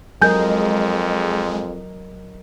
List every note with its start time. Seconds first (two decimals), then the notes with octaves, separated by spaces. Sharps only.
0.22 F2 F#3 G#3 A#4 D#5 G#5 G6